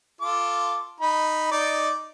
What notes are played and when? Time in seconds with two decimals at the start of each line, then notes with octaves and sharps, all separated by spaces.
0.21 F4 A4 D6
1.00 D#4 B5
1.51 D#4 D5